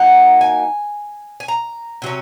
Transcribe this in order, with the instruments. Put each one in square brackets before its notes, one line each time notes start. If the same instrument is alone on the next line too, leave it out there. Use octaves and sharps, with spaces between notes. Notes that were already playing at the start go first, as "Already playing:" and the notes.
Already playing: [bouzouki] F#3 A#3 D#4 F#5
G#5
G#5
A#5
C3 F#3 C#4